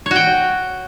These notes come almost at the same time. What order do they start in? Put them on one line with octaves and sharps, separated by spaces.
C#5 F#4 G5